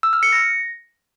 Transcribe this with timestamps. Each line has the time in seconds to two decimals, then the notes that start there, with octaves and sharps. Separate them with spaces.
0.03 E6
0.13 F6
0.23 C#7
0.32 A#6